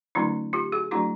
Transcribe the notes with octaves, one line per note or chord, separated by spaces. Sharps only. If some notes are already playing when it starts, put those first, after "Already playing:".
D3 F#3 A3 C#4 D#4 F4
F4 G4
F#4 G#4
F#3 A3 D4 E4 F#4